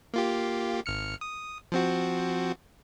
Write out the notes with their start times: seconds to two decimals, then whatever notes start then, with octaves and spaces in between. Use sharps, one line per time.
0.14 A#3 F4 G4
0.86 G#1 F6 C#7
1.21 D#6
1.72 F3 C4 F#4